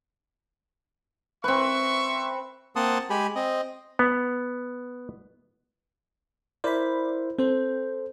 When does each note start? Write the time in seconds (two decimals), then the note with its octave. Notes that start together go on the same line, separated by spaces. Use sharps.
1.44 C4 B4 E5 C#6
2.76 A#3 C4 F#5 A5 C6 D#6
3.10 G#3 G4 G#5 B5
3.35 C4 D#5
3.99 B3
6.64 E4 A#4 C5 D5 B5
7.39 C4 A4 C5